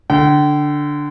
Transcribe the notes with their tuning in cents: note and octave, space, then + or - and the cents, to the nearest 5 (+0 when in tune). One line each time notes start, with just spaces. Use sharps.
D3 +0 G5 -40